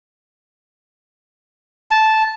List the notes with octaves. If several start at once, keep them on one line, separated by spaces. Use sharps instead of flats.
A5